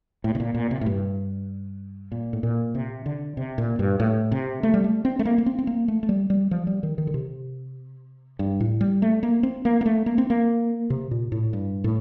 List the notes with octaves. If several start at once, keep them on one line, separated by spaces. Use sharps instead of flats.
A2
C3
A#2
A#2
C3
A2
G2
A#2
A2
A#2
C3
D3
C3
A#2
G2
A2
C3
A3
G3
A3
C4
A3
A#3
A#3
C4
C4
A#3
A3
A3
G3
G3
F3
G3
D#3
D#3
D3
C3
G2
A2
G3
A3
A#3
C4
A#3
A#3
A3
A#3
C4
A#3
C3
A#2
A2
G2
A2